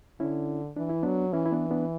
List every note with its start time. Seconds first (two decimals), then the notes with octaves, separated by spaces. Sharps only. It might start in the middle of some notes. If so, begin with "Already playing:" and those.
0.20 D3 C#4 E4
0.77 E3 D4
0.89 E4
1.03 F#3 B3 D4
1.33 E3 C#4 E4
1.46 E4
1.52 B3 D4
1.71 B3 D4